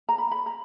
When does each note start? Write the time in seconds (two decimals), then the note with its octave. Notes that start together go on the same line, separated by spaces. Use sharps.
0.09 A#5
0.18 B5
0.31 B5
0.46 A#5